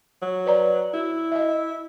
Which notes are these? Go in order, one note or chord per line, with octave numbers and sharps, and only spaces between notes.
F#3
B4 D5 A#5
E4 F#4
D#5 E5